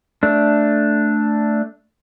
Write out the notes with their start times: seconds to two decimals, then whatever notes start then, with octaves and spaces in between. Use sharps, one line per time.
0.23 A3 D4